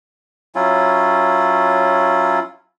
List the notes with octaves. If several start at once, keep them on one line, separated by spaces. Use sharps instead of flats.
F#3 C#4 E4 F4